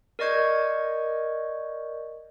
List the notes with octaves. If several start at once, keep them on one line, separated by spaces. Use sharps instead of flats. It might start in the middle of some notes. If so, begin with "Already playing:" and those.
A#4 D5 D#5 C#6 G6 G#6